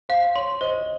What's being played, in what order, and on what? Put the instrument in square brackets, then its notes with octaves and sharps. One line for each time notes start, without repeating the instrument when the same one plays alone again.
[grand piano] C5 [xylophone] F5
[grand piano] C#5 [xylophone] C6
[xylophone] C5 [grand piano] D#5